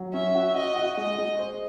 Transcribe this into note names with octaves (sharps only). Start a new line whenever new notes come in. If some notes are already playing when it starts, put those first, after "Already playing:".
Already playing: F#3
C#4 E5
F#4
F#4 D#5
F#4
G#3 D#5
G#3
C5